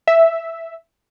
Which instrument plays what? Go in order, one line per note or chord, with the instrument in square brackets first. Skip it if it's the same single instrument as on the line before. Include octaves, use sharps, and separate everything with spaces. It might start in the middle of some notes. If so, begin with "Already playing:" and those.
[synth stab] E5